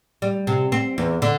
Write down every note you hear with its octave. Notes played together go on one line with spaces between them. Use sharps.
G3
C3
C4
E2
D3